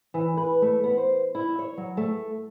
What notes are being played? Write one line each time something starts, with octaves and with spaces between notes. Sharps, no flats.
E3
B4
A3
B3
C5
E4
C#5
F#3
A3